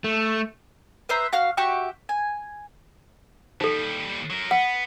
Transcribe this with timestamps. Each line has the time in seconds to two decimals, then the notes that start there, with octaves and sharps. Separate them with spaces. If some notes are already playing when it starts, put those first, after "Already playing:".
0.04 A3
1.09 B4 C5 E5 A#5
1.33 F#4 F5 F6
1.57 F#4 G4 E5 C#6
2.09 G#5
3.61 D#2 G3 D#4 A4
4.30 F#3 A#4
4.51 B3 F#5